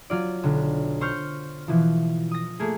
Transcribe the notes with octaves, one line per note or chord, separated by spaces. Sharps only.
F#3 F4 D5
B1 D3
C5 C#6 F6 G6
B2 E3 F3
D#6 A#6
A3 A#3 G#4